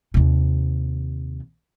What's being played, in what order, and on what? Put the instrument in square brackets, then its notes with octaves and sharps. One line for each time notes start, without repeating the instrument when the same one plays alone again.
[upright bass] D#2 C3